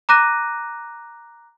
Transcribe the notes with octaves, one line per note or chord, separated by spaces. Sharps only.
A#5 D6 F#6 A#6 D#7